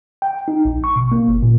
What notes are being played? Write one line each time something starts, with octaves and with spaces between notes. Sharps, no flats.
G5
D#4
A#1
C#6
B2
A#3
G1
A#2